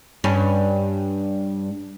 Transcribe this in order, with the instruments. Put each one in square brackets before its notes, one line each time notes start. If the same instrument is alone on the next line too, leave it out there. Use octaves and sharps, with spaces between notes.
[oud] G2 C#4